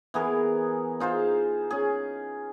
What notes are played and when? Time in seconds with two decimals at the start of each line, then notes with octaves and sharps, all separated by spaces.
0.14 E3 B3 G#4 A#4
1.00 D#4 F4 G#4 C5
1.71 C#4 G#4